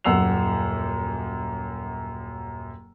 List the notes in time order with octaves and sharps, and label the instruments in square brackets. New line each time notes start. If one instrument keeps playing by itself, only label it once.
[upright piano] D#1 F#2 F#5 E6 C7 F7